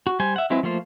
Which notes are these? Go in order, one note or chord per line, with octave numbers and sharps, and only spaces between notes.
F#4
G3 C5 G#5
E5 F#5
F#3 G#3 C4 E4 B4
F3 A3 A#3 F4 C5